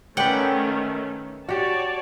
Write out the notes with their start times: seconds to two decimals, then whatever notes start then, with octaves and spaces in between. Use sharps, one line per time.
0.17 D#3 A3 C#4 B4 D5 F#5 G5
1.49 F#4 G4 C#5 D5 A5